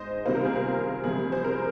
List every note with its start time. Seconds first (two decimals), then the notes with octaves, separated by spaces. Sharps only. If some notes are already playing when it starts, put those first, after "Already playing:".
Already playing: G#2 G#3 C5 D#5
0.25 C2 C3 D#3 A#3 F4 C5
0.35 A#4
0.45 G#4
0.55 A#4
1.04 C2 C3 F3 G#3 G#4
1.32 C5
1.44 A#4